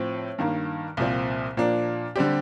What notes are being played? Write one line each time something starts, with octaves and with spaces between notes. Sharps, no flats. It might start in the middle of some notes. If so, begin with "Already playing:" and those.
Already playing: A2 F3 C4
G2 D#3 A#3
C2 A#2 F3 C4
A#2 F3 A#3 D4
D3 G3 C4 G4